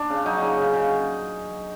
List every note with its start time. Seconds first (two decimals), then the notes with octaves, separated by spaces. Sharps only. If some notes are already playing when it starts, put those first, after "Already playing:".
Already playing: D4
0.10 C#3
0.25 F#3 D#4
0.42 C#3
0.57 C#3
0.73 C#3